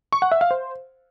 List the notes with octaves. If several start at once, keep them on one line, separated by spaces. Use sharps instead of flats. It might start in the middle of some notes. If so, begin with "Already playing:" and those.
C#6
F#5
E5
F5
C5